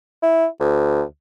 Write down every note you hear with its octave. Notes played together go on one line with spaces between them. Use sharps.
E4
D2